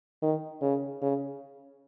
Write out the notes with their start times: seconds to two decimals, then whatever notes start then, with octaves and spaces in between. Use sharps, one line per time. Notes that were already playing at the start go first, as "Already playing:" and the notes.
0.22 D#3
0.62 C#3
1.02 C#3